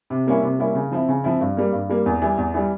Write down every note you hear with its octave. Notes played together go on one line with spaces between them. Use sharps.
C3
G3 A#3 C#4 E4
C3
G3 A#3 C#4 E4
C#3
F3 C4 E4
C#3
F3 C4 E4
G2
G3 A#3
G2
G3 A#3
E2
E3 G3
E2
E3 G3